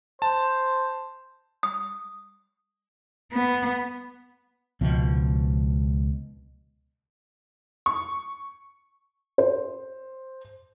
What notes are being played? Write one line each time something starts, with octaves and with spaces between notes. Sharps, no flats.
C5 A5
D#6
B3
C#2 B2 F3
C#6
C5